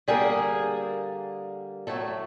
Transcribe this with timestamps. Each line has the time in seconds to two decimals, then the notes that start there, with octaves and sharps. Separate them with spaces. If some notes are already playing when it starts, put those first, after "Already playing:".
0.08 D3 G3 A#3 G#4
1.87 A2 F#3 A3 A4